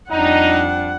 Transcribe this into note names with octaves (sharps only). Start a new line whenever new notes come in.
F2 G3 D4 D#4 F#5